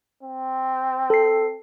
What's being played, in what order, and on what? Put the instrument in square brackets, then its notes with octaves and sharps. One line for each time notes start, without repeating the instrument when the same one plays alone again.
[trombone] C4
[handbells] A4 C7